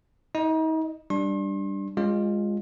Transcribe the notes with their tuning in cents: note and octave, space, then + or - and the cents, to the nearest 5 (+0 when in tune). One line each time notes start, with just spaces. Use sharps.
D#4 +40 D#5 -20
G3 +0 D4 +0 C6 +40
G#3 -15 C#4 +0 F4 +10